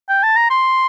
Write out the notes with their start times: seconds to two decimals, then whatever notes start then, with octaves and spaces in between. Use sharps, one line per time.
0.09 G5
0.23 A5
0.36 A#5
0.50 C6